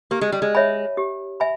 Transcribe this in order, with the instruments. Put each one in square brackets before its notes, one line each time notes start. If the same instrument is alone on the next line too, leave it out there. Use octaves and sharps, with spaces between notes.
[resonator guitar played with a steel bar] A#3 [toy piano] G4
[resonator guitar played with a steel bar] G#3
G3
G#3
[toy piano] C#5 E5 G#5 B5
G4
E5 G#5 B5